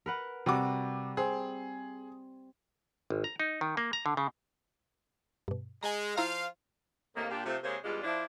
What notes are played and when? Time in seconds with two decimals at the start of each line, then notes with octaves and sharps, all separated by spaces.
0.06 A#4 B4 F#5
0.46 C3 G3 F#4 D6
1.17 C4 G#4
3.10 G#1
3.24 A#5
3.40 D#4
3.61 D#3
3.77 A#3
3.93 A#5
4.06 D3
4.17 C#3
5.48 G2 B2
5.83 G#3 G#5 A#5
6.16 F3 E4 F4 F5 A#5 F6
7.16 A2 C3 D#3 A#3
7.30 A#2 D4 F4 G4
7.45 C3 F3 A3
7.64 C3 G#3 A#3 C4 C5 C#5
7.84 E2 G3 G#3 D4 F4
8.03 F3 D4 E4